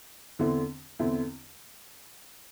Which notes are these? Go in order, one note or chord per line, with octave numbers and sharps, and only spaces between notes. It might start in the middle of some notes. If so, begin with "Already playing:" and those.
E2 D3 C4 E4
E2 D3 C4 E4